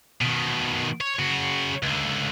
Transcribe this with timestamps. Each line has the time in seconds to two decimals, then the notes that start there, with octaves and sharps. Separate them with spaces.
0.21 B2 D#3
1.01 C#5
1.19 C#3 F#4
1.83 C#2 D3